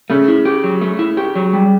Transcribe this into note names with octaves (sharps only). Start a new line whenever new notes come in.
C#3 A3
E4
G4
F#3
A3
E4
G4
F#3
G3